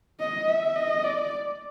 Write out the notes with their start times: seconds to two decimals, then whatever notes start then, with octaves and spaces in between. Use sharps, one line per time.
0.19 D#5
0.48 E5
0.76 D#5
1.04 D5